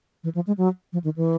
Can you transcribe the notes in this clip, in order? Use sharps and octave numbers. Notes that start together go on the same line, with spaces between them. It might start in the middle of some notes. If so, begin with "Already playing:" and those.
E3
F3
G#3
F#3
F3
D#3
E3